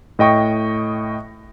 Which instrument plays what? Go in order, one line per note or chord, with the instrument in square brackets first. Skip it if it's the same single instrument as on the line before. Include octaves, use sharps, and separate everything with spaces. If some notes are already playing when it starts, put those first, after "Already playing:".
[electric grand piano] A2 D#5 G5 C#6 A#6